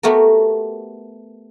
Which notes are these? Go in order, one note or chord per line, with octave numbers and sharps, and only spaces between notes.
A3 B3 F#4 G4 A#4